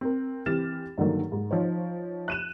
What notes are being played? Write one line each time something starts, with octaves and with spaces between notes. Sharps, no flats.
C4 A#4
E3 C4 G4 F6 A6 E7
G2 D3 D#3 F#3 A#3
G#2
F3 D#4 C5 C#5
F#6 D#7 E7